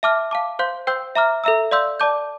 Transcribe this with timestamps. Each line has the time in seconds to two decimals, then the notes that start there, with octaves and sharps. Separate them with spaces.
0.03 E5 A5 D6 F6
0.31 F5 A5 D6
0.59 C5 F5 C6 G6
0.87 C5 G5 C6 E6 G6
1.15 E5 A#5 D6 F6
1.44 A4 E5 A#5 E6
1.71 D5 F5 C6 E6 G6
2.00 D5 A5 D6 G6